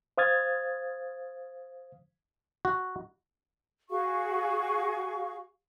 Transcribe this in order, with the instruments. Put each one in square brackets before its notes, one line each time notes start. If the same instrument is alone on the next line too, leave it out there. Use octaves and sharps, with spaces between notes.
[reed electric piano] C5 F5 D#6 F6 G#6 A6
[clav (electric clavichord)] F#4
[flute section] F#4 G#4 F5 C#6